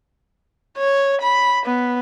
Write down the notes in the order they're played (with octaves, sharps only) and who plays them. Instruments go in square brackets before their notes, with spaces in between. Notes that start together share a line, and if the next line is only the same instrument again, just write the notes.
[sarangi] C#5
B5
B3